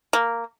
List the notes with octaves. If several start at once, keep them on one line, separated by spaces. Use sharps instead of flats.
A#3